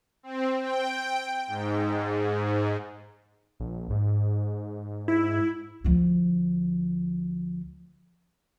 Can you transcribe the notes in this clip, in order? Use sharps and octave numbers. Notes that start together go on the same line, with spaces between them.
C4
G5
G#2
A#1
G#2
E4
D2 F3